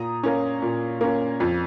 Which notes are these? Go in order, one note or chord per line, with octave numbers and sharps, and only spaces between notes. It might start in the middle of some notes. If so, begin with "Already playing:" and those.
Already playing: A#2 A#5 D#6
A#3 C#4
A#2
A#3 C#4
F2